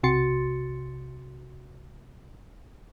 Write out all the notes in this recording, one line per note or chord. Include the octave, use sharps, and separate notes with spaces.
B1 C3 F#4 C6 A6 C#7